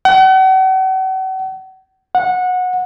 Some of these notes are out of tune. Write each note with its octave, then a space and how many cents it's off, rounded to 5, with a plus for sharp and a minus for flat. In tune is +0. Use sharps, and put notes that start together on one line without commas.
F#5 +40
F#5 -20